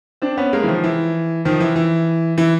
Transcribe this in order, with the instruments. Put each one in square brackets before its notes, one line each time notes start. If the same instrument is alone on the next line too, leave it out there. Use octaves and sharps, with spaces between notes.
[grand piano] C4 D4
B3 C#4
G#3 A#3
E3
D#3 F3
E3
D#3 F3
E3
E3
E3